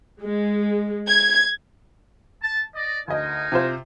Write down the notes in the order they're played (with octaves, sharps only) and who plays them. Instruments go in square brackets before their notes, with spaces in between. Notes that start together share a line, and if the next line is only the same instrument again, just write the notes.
[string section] G#3
G#6
[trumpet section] A5
D5 D#5
[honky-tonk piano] D2 D#5 [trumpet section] D#4 A#4 G#5
[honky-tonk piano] C3 F4 C5